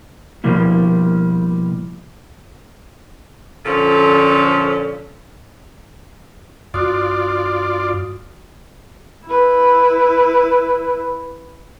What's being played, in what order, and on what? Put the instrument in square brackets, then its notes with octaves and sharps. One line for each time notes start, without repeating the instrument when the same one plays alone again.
[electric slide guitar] B2 F3 G3 A#3 E4
[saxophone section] A#2 D3 F3 C#4 A4
[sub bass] G2 [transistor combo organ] F4 D5 [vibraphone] F#4 D#6
[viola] E4 B4